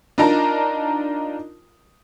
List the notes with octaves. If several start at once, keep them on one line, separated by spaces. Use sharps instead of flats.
D4 D#4 F4 A#4 A5 A#5